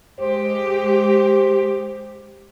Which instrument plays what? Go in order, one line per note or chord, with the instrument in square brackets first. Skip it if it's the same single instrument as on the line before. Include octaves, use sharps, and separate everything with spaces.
[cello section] G#3 G4 [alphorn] C5